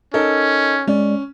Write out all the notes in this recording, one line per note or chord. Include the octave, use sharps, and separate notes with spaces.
C#4 D#4 A4 A#4
G#3 C#4 D5